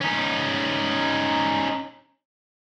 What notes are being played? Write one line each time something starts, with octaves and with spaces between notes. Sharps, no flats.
C#4 D#4